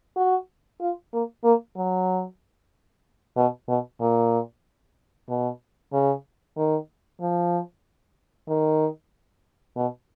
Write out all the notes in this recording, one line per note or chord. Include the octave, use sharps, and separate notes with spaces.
F#4
F4
A#3
A#3
F#3
B2
B2
A#2
B2
C#3
D#3
F3
D#3
B2